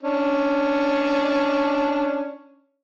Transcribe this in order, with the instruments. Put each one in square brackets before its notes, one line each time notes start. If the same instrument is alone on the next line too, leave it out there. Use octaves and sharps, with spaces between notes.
[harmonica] C#4 D4